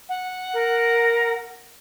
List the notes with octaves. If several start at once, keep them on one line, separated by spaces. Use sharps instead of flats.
F#5
A#4